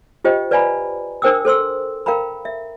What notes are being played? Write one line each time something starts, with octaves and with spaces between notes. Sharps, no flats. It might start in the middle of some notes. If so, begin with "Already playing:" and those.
F4 G4 C5 D#5 G5
B4 D5 F5 G#5 A#5 B5
D4 A#4 C5 G5 D#6 E6
A4 C5 C6 E6
A#4 F5 G5 A#5 B5
E5